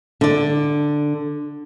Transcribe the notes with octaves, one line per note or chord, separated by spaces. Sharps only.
D3 D5